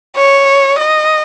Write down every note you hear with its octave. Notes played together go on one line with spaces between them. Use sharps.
C#5
D#5